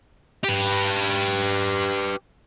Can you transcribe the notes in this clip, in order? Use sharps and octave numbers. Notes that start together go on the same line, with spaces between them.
G4 B4